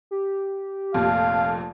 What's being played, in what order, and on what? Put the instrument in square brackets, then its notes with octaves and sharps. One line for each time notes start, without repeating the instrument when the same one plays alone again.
[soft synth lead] G4
[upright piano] F1 F2 A#2 [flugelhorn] F5